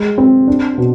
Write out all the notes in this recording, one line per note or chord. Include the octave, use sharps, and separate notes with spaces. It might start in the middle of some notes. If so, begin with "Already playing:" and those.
Already playing: G#3
C4
D4
B2